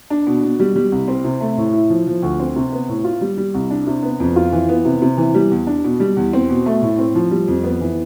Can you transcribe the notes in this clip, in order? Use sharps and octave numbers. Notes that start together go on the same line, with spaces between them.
D4
B2
B2
G3
G3
C2
C4
C3
A3
A2
E4
F3
F3
D2
C4
C3
B3
A2
F4
G3
G3
C2
D4
C3
B3
F2
F4
E3
B3
C3
C3
E3
G3
E2
D4
B2
G3
E2
C4
B2
A3
A2
C4
F3
G3
F2
B3
E3